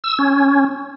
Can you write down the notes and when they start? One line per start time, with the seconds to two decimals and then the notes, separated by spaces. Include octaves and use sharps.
0.04 E6
0.19 C#4